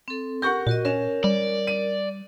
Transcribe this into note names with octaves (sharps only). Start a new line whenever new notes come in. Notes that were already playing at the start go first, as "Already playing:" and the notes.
C4 A4
G4 A#4 F#5 C#6 G6
A#2 F#4 A#4 D#5
C#4 A#4 E7
G3 D5
D#7